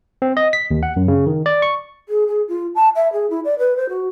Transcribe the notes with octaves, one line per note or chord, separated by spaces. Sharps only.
C4
D#5
B6
D#2
F#5
F#2
C#3
D#3
D5
C#6
G#4
G#4
F4
A5
E5
G#4
E4
D5
B4
C5
F#4